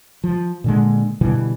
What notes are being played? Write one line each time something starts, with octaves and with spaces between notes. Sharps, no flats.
F3
A#2 D3 G#3
B2 D3 E3 G3